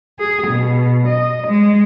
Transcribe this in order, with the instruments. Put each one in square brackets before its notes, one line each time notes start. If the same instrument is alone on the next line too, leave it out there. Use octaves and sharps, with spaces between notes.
[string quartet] G#4
B2
D#5
G#3